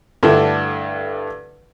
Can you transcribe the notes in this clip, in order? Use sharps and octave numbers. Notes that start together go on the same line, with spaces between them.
G2 D3 A3 D4 E4